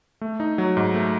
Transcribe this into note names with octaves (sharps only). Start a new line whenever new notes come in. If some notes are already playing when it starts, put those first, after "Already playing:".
A3
D#4
F#3
G#2
A3